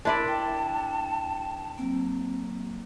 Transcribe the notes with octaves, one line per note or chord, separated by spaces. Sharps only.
D4 E4 A#4 D5 A5 C6
G5
F#3 A#3 C4